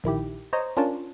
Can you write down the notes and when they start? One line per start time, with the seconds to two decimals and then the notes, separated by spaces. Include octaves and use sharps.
0.04 A#1 D#3 E4 G4
0.53 C5 C#5 D#5 A#5
0.77 C#4 D4 F4 A#4 C#5 A5